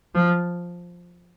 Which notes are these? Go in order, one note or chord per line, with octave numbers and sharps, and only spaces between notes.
F3